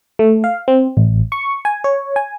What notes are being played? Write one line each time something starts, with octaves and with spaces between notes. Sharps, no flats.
A3
F5
C4
A1
C#6
G#5
C#5
G#5